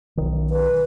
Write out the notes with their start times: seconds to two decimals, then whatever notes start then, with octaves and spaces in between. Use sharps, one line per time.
0.17 B1 D#3
0.50 B4